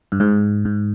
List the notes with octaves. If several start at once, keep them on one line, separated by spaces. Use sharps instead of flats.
G2
G#2
G#2